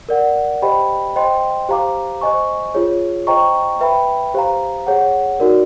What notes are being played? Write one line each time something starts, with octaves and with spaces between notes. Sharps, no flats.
A#4 D5 F#5
G4 C5 D#5 G5 B5
C5 D#5 G5 C6
G4 C5 F5 A#5 D6
C5 D#5 G#5 C#6
F4 G#4 C#5
C5 D#5 G5 A#5 C#6
B4 E5 G5 B5
G4 C5 F5 A#5
G#4 C#5 F#5
D#4 F#4 A#4 D5